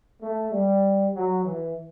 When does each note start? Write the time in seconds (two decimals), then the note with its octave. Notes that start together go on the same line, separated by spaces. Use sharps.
0.22 A3
0.52 G3
1.14 F#3
1.45 E3